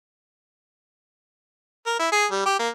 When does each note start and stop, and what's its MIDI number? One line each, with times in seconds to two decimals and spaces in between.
1.86 1.95 70
1.99 2.08 64
2.12 2.26 68
2.31 2.45 55
2.46 2.57 67
2.59 2.69 58